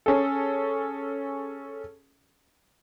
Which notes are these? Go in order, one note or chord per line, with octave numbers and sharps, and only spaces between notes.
C#4 G#4 A4